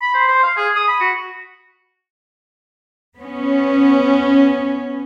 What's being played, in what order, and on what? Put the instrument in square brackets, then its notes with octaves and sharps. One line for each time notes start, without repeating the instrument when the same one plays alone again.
[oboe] B5
C5
C5
F5
G#4
D#6
B5
F#4
[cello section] B3 C#4